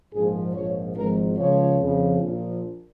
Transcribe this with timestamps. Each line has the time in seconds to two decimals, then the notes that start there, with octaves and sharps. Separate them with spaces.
0.13 A#1 G#2 F3 G#4
0.54 A#1 G#2 F3 C#5
0.96 G#1 G#2 F3 A#4
1.38 C#2 C#3 F3 C#5
1.79 F2 C#3 F3
2.21 A#1 A#2 F3